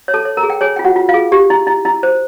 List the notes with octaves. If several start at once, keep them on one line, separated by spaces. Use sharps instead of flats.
C#5
A4 A5
C#5
A#4 A#5
G#4
G5
G#4 C#5 G#5
G5
F4
F#4 F#5
F4
F4 F5
G#4
G4
E4
E4
E4
C5